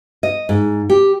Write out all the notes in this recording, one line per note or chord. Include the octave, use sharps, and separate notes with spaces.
D#5
G#2
G4